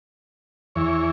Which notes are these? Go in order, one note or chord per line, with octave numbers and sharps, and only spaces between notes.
E2 E3 C#5